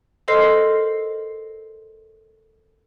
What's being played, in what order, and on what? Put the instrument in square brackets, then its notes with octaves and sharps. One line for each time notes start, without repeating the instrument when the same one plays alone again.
[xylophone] A4 A#4 C5 D#5 C6 C7